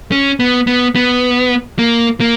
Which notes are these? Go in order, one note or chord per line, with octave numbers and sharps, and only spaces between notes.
C#4
B3
B3
B3
A#3
A#3